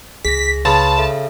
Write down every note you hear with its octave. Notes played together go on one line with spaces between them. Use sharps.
C#2 G#4 A#6 B6
C#3 B4 A5 B5 C6
A4 E5